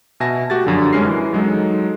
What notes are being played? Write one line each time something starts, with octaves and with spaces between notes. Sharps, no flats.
B2 E5 G#5 A5 A#6
A3 F#4 G4 A6
F#2 D3 F3
F#2 G3 G#3 C#4 A#4 C7
E3
F#3 G#3 D#4 A4